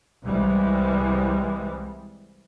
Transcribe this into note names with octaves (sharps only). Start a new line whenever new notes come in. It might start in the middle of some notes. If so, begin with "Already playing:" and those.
C2 E3 G3 G#3